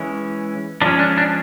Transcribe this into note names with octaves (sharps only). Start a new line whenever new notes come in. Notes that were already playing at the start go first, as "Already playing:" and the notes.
Already playing: E3 G#3 C#4
F3 G#3 C#4 D4
D4
D4